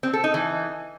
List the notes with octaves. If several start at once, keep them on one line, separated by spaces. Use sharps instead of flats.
C4
A4
D#4
E3